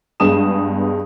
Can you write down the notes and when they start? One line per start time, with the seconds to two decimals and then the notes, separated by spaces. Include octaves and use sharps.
0.20 G2 G#3 B3 G#4 D#6 E7